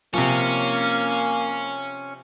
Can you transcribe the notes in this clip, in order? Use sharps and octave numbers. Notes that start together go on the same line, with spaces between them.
C3 F3 A#3 C#4